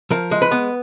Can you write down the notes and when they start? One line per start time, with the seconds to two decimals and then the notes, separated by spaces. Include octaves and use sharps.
0.11 F3 A#4
0.31 G#3
0.42 B4
0.51 B3